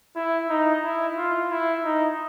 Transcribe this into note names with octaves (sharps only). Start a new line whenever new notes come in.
E4
D#4
E4
F4
E4
D#4